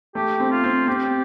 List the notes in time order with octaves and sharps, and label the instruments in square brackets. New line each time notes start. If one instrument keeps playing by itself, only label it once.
[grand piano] A3 [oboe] G4
[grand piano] C4
[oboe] F4
[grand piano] C4
[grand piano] C4 [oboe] G4